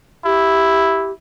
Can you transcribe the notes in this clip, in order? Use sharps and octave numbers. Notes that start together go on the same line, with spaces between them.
E4 G4